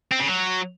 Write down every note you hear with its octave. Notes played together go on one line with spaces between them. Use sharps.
C4
C#3
F#3